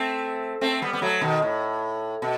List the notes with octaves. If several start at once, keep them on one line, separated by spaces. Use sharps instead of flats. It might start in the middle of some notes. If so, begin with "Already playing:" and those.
Already playing: A3 C4
A3 C4
G3 B3
B3
F#3 A3
B2 D#3
A2
B2